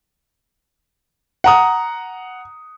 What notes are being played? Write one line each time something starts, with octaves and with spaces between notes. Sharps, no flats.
F#5 A#5 D#6